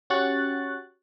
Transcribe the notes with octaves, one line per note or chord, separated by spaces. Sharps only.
C#4 F#4 G4 C#6 F#6 A6